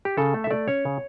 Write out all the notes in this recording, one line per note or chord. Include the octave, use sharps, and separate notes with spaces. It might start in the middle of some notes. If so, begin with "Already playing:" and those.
G4
C#3 A4
A3
E5
A3 D5
C#4 C#5
C#3